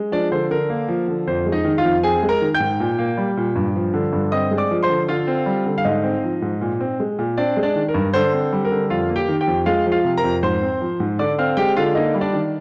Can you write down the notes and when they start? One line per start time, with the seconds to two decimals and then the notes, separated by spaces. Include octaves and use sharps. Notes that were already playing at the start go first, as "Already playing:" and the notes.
Already playing: G#3
0.12 F3 D4 D5
0.32 D3 C5
0.51 D3 A#4
0.70 A#3
0.89 F3
1.08 D3
1.27 F2 C5
1.46 G#3
1.52 D#4 D#5
1.65 D#3
1.78 F4 F5
1.84 F2
2.03 C4 G#4 G#5
2.23 G#3
2.29 A#4 A#5
2.41 D#3
2.54 G5 G6
2.60 G#2
2.80 A#2
2.99 A#3
3.18 G3
3.37 A#2
3.56 G2
3.76 F3
3.94 D3
4.13 G2
4.32 C4 D#5 D#6
4.51 G#3
4.57 D5 D6
4.71 F3
4.83 C5 C6
4.89 D3
5.09 D3 F4 F5
5.27 C4
5.46 G3
5.66 D3
5.78 F5
5.85 G#2 D#4 D#5
6.04 C4
6.24 F3
6.42 G#2
6.61 A#2
6.80 C4
7.00 G#3
7.19 A#2
7.37 C4 D4 D5
7.57 G#3
7.63 D4 D5
7.76 D#3
7.88 A#4
7.94 G2
8.14 D3 C5
8.33 C4
8.53 G3
8.65 A#4
8.71 D3
8.90 F2 F4 F5
9.09 A#3
9.16 G4 G5
9.29 D#3
9.41 G4 G5
9.48 F2
9.66 G#3 F4 F5
9.86 F3
9.92 F4 F5
10.04 C3
10.17 A#4 A#5
10.24 F2
10.43 G#2 C5 C6
10.62 C4
10.81 F3
11.00 G#2
11.19 D3 D5 D6
11.38 C4 F5 F6
11.57 G#3 G4 G5
11.77 D3 F4 F5
11.95 A#3 D#4 D#5
12.15 G3
12.21 D4 D5
12.33 D#3